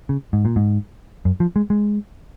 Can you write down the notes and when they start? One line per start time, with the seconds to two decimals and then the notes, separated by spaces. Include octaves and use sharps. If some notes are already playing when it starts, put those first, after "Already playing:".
0.09 C#3
0.33 G#2
0.45 A#2
0.56 G#2
1.25 F#2
1.40 F3
1.56 G#3
1.70 G#3